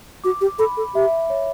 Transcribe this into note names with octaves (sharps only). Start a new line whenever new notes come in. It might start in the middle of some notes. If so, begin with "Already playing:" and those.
F#4 D6
G4
A4 B5
A4
G4 E5
C#5